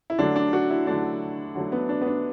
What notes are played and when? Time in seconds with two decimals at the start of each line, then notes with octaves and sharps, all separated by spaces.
0.10 E4
0.18 D3 F#3 A3 D4
0.36 D4
0.53 F#4
0.70 E4
0.87 D3 F#3 A3 D4
1.55 D3 F#3 A3
1.72 B3
1.89 D4
2.01 B3
2.06 D4